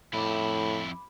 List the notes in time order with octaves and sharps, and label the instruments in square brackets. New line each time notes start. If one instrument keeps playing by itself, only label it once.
[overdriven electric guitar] F2 E4 [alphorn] A2 [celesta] B5 D6